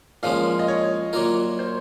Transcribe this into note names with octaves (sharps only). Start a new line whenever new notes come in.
A#2 F3 G#3 C#4 F5
D#5
C#5
A#2 F#3 A#3 F4 A#4
C5